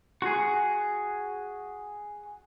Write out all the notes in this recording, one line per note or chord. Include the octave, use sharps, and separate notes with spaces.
F#4 G#4